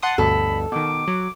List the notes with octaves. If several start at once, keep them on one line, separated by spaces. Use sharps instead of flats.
F#5 A5 C6 D#6
D2 G2 B2 A4 B5
B2 D#3 D6
F#3